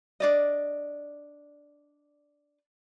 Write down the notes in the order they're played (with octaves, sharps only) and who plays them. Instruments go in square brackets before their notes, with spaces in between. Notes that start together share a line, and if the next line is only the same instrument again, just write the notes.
[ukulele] D4 D5 D#5